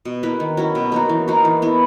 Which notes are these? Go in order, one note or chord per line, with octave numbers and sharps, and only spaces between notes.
B2
A#3 E4 B4
D#3
F#3 C#4 E4
B2
A#3 D#4 F#4
E3
A#3 D#4 F#4
E3
B3 E4